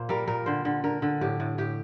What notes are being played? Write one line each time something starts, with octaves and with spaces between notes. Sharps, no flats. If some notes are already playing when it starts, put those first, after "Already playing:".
Already playing: A#2 A#3 C5
G3 A#4
A#2 A#4
D3 C5
D3
D3 A#4
D3
A2 G4
A2
A2 G4